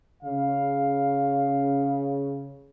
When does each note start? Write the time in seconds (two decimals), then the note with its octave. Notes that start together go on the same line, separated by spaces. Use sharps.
0.23 C#3 F5